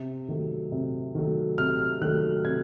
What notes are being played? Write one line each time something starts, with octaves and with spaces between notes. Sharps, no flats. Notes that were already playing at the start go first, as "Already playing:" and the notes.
Already playing: C3
D#3 F#3 A3
C3
D#3 F#3 A3
C3 F6
D#3 F#3 A3 F#6
C3 G#6